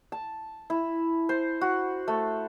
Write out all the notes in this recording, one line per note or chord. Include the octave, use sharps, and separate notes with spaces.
A5
E4
C5
F#4
A3